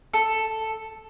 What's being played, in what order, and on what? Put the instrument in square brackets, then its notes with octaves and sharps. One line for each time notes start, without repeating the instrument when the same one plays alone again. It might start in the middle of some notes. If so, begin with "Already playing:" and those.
[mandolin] A4